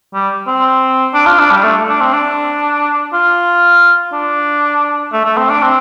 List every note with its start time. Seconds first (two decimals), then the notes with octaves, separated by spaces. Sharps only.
0.14 G3
0.47 C4
1.14 D4
1.26 F4
1.39 D4
1.51 G3
1.64 A3
1.89 D4
2.01 C4
2.13 D4
3.13 F4
4.13 D4
5.12 A3
5.25 A3
5.37 C4
5.50 D4
5.62 C4